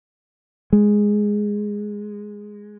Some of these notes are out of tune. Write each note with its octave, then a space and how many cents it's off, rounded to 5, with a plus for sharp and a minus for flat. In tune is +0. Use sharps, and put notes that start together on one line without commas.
G#3 -5